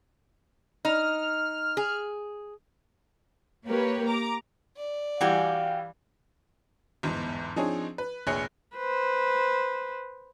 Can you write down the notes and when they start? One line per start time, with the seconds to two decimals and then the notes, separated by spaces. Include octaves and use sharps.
0.85 D#4 F6
1.77 G#4
3.67 A#3 G4 A#4 B4 C#5
4.08 A#5 D6
4.77 D5
5.21 E3 G3 F#4 G4 F5 G#5
7.03 G1 E2 G#2
7.56 F3 C4 D4 D#4 G#4 C#5
7.98 B4
8.27 F1 A#1 G#4 C#5 F#6 C#7
8.76 B4 C5